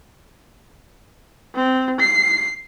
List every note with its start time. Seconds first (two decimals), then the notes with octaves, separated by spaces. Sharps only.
1.55 C4
2.00 C7